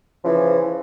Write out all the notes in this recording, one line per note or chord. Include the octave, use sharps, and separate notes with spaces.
C#3 E3 F3